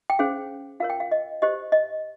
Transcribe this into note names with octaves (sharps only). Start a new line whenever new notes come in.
G5
C#4 G#4 C5 F5
F4 A#4 C#5 F5
G5
F5
D#5
G4 C5 D#5
D#5